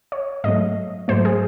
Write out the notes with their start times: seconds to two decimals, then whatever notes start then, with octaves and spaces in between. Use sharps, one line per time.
0.12 C#5
0.44 G#2 F#3 A3 D#5
1.08 G#2 F#3 A3 C5
1.25 G#4